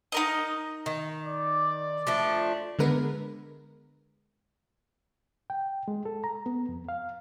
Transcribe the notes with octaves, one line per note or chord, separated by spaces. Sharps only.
D#4 A#4 D#5
D#3
D5
F3 A3 D4
D3 G#3 B3 A#4 B4
G5
G#3
A4
A#5
B3
F2
F5